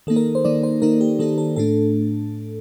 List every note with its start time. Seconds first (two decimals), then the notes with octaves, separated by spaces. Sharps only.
0.07 D#3 A#3 D#4 A4
0.16 A#4
0.35 C5
0.45 D#3 A#3 D#4 D5
0.63 C5
0.82 D#3 A#3 D#4 A#4
1.01 G4
1.19 D#3 A#3 D#4 A4
1.38 A4
1.56 A2 A3 D4 A4